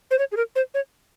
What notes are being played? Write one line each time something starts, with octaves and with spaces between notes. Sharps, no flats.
C5
C#5
G#4
A#4
C5
C#5